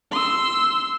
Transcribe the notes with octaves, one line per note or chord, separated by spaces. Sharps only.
C6 E6